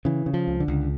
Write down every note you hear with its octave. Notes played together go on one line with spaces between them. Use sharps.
C#3 E3
C#3
F3
C#2
D3
C#2